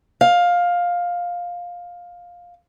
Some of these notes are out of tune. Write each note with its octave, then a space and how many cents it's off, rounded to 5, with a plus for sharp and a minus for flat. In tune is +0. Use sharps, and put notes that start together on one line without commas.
F5 +15